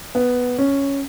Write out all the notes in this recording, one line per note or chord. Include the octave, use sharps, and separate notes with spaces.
B3
C#4